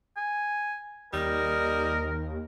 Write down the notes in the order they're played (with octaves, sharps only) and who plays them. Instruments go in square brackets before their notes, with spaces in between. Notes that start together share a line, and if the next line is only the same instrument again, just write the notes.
[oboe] G#5
[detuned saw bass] D#2 [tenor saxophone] G3 [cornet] A#4 [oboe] D#5